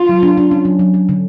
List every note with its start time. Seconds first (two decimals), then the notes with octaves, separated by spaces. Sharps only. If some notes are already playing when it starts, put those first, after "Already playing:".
Already playing: F4
0.09 F#3
0.23 D4
0.37 D4
0.51 C#4
0.65 F#3
0.79 F#3
0.94 F#3
1.09 D3